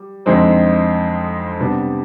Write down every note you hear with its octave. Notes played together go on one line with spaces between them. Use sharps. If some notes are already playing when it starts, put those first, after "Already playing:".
Already playing: G3
F2 D3 G#3 C4 D#4
C3 G3 B3 D4